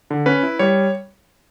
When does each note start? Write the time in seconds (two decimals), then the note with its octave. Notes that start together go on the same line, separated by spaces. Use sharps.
0.11 D3
0.26 C#4 B4
0.43 E4
0.59 G3 C#5